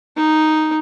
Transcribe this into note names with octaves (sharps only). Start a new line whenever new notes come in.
D#4